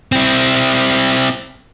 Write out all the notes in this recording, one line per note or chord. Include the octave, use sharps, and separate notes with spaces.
C4 E4